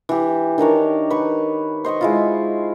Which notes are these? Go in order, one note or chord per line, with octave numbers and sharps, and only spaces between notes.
E3 G4
D#3 D4 A#4 C#5
B4 C#6
C5 D#5 B5 C#6
G#3 E4 F4